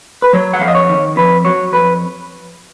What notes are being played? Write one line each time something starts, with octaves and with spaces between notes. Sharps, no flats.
B4
F#3 C#5
F#5
F2 F5
D#5
C#5
D#3
F2 B4
F#3 C#5
F2 B4